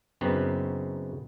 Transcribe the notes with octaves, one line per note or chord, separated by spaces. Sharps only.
F#2 C#3 B3 C4 D#4